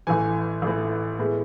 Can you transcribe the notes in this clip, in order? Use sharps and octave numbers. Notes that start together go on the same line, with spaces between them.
A1 A2 E3 G#5
A1 A2 E3
A2 G#3 B3